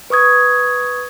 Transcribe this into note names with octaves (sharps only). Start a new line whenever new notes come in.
B4 C#6 D#6 G#6